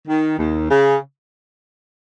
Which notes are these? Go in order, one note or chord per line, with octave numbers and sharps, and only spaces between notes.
D#3
D#2
C#3